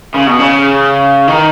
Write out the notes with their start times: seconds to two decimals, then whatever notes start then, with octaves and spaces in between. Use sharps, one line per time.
0.14 C#3
0.26 B2
0.39 C#3
1.27 D#3